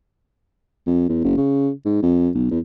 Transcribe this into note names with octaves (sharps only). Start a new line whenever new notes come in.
F2
E2
F#1
C#3
G#2
F2
B1
E2